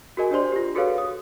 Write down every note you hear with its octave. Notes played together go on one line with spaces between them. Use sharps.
F#4 G#4 A#4 D#5 G#5
D4 G4 C5 D5 C6
F4 G4
F#4 G#4 A4 B4 C#5 F5
D#6